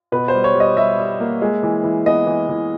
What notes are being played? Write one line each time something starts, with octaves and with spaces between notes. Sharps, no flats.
B2 B4
C5
G3
C#5
G3
D#5
G3 E5
G3
A#3
G#3
E3
E3
B3 D#5
E3
E3